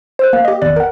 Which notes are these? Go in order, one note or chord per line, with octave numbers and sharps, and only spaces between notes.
C5 E6 F#6
A#3
G4 D#5
G#1 E2 D5 F#6 A6
A#4 F#5